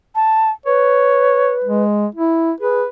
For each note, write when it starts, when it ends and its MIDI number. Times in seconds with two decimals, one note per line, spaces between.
0.15 0.50 81
0.66 1.84 71
0.66 1.54 73
1.64 2.07 56
2.15 2.52 64
2.60 2.82 68
2.60 2.87 71